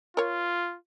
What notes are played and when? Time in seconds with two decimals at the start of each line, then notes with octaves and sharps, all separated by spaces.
0.17 F4 A#4 C#5